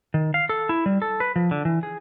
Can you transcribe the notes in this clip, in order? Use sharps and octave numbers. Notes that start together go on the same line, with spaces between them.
D#3
F5
A4
E4
G3
A4
B4
F3
D3
E3
G#4